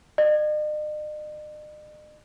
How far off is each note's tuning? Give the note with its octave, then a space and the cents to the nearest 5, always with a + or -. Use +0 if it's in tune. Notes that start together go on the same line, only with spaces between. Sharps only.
D#5 -45